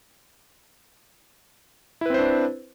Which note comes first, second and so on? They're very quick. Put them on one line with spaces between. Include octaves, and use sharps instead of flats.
E4 B4 C4 C5 D4